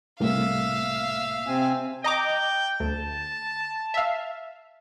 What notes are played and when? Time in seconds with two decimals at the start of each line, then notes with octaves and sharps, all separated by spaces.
0.20 C2 A2 A#3 E5 F5
1.47 C3 C4 G#5
2.04 D#5 G5 A#5 D6
2.80 D2 A5
3.94 E5 F5